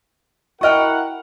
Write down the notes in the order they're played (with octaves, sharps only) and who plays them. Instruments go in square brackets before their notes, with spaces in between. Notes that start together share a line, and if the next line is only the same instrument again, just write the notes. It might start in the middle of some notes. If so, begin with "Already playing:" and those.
[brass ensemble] E4 A#4 F#5 [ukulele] F#4 D#5 G5 [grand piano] C#6 F6